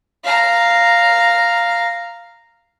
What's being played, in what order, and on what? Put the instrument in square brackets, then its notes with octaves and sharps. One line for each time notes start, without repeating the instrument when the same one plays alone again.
[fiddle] F5 A#5